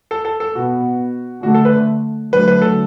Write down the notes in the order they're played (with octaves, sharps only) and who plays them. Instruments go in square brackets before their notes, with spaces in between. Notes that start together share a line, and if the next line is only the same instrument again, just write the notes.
[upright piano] A4
A4
A4
[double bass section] B2 B3 [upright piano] F#4
[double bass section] D3 A3 [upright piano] F#4
[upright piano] A4
B4
[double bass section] D3 F#3 A3 [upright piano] B4
[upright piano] B4
A4